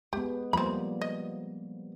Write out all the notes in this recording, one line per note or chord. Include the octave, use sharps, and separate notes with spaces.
G#3 B3 G4
F3 G3 A#3 C4 B5
D#5